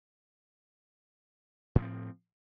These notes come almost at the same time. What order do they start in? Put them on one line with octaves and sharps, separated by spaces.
A2 F3 C4